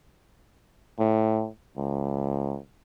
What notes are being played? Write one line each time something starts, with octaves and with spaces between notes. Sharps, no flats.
A2
C#2